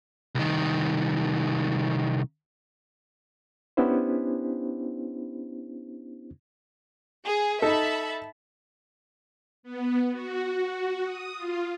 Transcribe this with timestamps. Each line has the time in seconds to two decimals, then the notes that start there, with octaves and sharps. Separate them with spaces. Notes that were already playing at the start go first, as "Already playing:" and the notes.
0.35 C2 D#3
3.77 B3 C#4 D4 E4 G4 C5
7.25 G#4
7.62 D#4 A4 E5 A5 B5
9.63 B3
10.12 F#4
11.04 D#6
11.36 F4